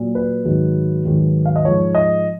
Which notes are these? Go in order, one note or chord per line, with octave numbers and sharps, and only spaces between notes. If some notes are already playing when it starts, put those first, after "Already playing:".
Already playing: A#2 F#3
B4
G#2 D#3 F#3
G#2 D#3 F#3
F5
D#5
G#2 F3 C#5
D#5